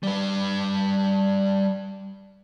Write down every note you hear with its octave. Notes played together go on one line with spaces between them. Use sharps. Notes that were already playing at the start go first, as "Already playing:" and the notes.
G3 B4